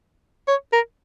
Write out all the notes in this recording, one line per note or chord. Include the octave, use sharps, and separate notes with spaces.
C#5
A#4